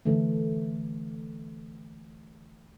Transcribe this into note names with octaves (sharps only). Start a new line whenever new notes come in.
D3 E3 A3